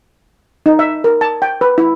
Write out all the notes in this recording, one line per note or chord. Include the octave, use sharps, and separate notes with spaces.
D#4
E5
A#4
A5
G5
B4
E4